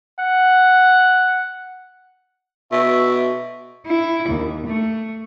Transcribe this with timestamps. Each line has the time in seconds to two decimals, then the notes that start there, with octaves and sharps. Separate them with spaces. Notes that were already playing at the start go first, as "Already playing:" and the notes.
0.19 F#5
2.72 B2 E5
3.86 E4
4.29 D#2
4.67 A3